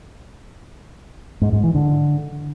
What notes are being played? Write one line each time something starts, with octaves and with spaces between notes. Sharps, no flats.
G#2
G#2
E3
D3